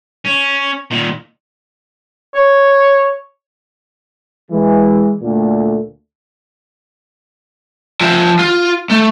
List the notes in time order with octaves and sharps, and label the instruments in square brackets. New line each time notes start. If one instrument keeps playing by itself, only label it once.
[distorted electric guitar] C#4
A#2 D#3
[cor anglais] C#5
[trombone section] E3 G#3
D2 A#2 A3
[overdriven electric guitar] F3 E5
F4
A3